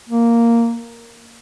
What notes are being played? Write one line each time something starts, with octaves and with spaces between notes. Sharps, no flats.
A#3